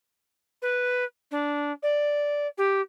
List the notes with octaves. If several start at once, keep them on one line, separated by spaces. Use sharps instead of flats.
B4
D4
D5
G4